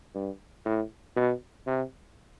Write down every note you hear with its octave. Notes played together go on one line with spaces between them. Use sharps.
G2
A2
B2
C3